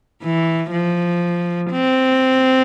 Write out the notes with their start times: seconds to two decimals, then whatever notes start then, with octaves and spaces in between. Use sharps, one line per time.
0.23 E3
0.72 F3
1.71 C4